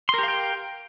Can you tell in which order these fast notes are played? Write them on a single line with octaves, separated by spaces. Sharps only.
C6 A#4 G4 F5 G5